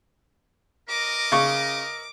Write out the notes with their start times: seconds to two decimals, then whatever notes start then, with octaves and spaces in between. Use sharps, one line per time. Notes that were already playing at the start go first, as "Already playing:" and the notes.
0.89 A#4 D#5 D6
1.32 C#3 C#6